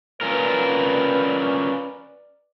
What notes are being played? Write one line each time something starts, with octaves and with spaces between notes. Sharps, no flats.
C#4 F4 A#4 B4 D5